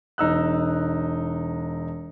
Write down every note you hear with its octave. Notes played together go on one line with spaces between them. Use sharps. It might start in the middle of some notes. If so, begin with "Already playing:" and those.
E1 D#4 E6 F#6